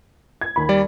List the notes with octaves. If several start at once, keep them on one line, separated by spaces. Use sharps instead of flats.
G#6
D#2 B5
G3 D5